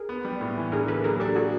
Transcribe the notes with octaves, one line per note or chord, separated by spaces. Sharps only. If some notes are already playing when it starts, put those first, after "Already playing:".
Already playing: G#4 A#4
B3
G3
A2
E3
D3 G#4 A#4
A#3 A4 B4
F#3 G#4 A#4
D4 G4 A4
F#4 G#4